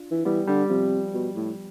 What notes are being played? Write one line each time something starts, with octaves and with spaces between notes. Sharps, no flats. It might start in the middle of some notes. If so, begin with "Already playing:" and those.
Already playing: D4 F4
E3
E3 G3 B3
D3 G3
C3 F3
B2
A2